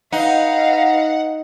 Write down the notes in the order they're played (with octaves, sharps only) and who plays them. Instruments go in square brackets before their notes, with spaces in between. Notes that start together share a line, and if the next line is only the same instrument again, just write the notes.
[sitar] D#4 [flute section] B4 D#5 [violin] F5 [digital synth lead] F#5